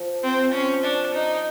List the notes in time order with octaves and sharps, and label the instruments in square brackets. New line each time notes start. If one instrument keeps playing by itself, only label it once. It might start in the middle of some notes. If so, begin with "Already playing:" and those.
Already playing: [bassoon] F3
[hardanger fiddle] C4
C#4
D4
D#4